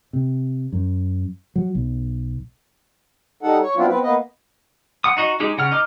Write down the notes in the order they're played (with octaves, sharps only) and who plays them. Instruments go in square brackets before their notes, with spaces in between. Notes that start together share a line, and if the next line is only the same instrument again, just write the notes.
[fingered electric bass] C3
F#2
F#3
B1
[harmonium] G3 D#4 A4 F#5
C#5
F#3 B3 C4 D4 E4 F4
B3 C4 B4
A#3 B3 B4 D#5
[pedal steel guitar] F#5 D#6
D#4 F#4 D#5
G#3 D#4 G4 G#4
C#3 F#5 F6
D#4 D#5 D6 F6